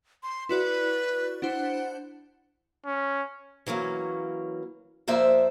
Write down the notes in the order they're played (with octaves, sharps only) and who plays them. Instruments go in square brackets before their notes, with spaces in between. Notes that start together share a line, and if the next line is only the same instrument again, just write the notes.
[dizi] C6
[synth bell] E4 F#4 D5 [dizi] B4
[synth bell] D4 E4 C5 [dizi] F#5
[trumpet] C#4
[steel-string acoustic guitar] E3 F#3 A#3 C#4
F2 A#3 C5 D5 E5